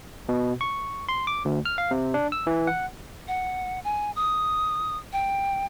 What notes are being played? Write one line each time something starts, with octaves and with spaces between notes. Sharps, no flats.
B2
C#6
C6
D6
D2
F6
F5
C3
D4
E6
E3
F#5
F#5
G#5
D#6
G5